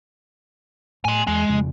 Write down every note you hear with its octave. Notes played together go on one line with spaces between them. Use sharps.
A2 G#5 C6
E2 G#3
F2 C#3